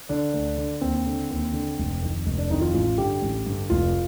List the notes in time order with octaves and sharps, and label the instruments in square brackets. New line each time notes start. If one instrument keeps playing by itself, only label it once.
[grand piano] D3 D4
D2
D3
D#2 C4
D3
D#2
D3
F1
F2 D#3
F1
D4
F2 D#3 D#4
F4
A1 F4
G2 D3 G4
A1
G2 D3
F1 F4